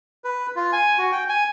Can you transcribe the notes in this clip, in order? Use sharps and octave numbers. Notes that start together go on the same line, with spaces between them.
B4
F4
G#5
F#4
G5
G#5